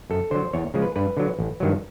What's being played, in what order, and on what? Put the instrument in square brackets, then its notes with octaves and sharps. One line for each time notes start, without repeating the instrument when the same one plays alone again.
[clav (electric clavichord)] F#2 A4
D3 F#3 C5
E2 C#5
C#3 F3 G#3
B4
G2 B4
D3 F#3
A1
G2 D#3 F#3